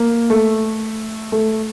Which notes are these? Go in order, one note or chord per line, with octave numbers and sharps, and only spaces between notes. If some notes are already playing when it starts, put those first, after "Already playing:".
Already playing: A#3
A3
A3